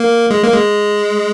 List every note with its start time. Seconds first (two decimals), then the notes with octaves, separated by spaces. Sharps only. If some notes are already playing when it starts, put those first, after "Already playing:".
Already playing: A#3
0.30 G#3
0.42 A#3
0.54 G#3